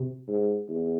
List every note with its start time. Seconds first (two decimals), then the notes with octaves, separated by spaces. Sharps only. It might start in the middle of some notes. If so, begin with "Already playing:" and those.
Already playing: C3
0.28 G#2
0.68 E2